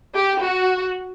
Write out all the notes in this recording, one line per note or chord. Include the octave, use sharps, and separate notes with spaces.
G4
F#4